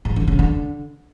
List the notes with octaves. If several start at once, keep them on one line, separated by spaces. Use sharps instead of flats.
G#2
D3
C#3
D3